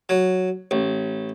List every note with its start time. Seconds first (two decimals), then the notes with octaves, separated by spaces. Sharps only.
0.09 F#3
0.71 A1